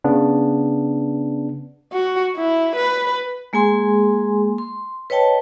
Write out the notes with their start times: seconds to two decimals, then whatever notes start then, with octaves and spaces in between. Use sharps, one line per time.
0.04 C#3 B3 D4
1.93 F#4
2.37 E4
2.76 B4
3.53 G#3 A#3 G#4 G#5 C6
4.58 C6
5.10 B4 C#5 D#5 G5 A5